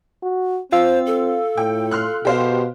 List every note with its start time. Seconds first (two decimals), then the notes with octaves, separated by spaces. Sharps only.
0.23 F#4
0.72 C4 F4 C5 F5 E6
1.07 A4
1.58 A2 G5
1.91 C6 F6 F#6
2.25 B2 G4 C5 F5